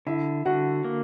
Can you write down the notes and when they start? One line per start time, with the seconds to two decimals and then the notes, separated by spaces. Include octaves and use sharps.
0.07 D3 E4 E5
0.45 D3 F#4 F#5
0.84 A#3